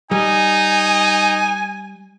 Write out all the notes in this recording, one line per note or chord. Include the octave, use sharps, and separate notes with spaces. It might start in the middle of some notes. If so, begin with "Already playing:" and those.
G3 D#4 G#5